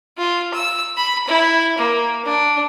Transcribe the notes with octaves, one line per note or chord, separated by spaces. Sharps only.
F4
E6
B5
E4
A#3
D4